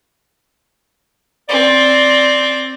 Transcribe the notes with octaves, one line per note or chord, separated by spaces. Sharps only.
C4 D5